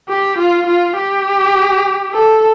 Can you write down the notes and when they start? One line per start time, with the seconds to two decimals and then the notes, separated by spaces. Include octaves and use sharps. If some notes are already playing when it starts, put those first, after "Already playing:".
0.09 G4
0.39 F4
0.67 F4
0.97 G4
2.14 A4